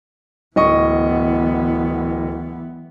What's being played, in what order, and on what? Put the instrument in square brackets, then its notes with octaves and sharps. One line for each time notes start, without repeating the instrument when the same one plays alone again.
[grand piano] D1 D#5 C#6 [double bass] E3 B3